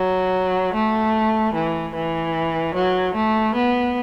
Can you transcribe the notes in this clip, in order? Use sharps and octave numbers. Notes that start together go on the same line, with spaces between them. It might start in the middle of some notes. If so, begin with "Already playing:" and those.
Already playing: F#3
A3
E3
E3
F#3
A3
B3